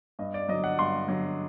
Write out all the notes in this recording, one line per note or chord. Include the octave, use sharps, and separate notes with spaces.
G2 D#5
D5
D3 F#3 D#5
F#5
G2 C6
D3 F#3